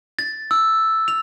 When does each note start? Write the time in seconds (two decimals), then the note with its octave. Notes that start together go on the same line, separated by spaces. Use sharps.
0.19 A6
0.51 E6
1.08 F7